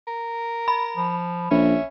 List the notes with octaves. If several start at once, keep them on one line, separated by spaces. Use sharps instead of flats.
A#4
B5
F3
A#1 C#4 E5